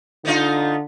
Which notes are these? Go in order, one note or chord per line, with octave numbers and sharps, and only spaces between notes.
D3 B3 D#4 F4